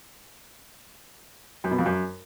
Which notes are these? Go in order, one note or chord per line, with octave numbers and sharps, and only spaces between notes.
F#2
B2
F2
F#2